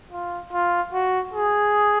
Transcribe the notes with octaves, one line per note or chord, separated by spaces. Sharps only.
F4
F4
F#4
G#4